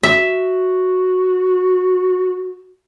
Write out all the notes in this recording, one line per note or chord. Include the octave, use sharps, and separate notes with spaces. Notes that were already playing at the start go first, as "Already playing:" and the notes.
F#4 E5